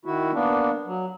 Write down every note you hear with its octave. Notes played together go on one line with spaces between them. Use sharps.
D#3 E4 F#4
A#3 B3 D4
F#3